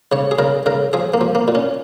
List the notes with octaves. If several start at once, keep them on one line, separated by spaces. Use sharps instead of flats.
C#3 C#5
G#4
C#3 A#4
C#3 A#4
F3 G#4
A#3
F3
A#3
A#2
C#4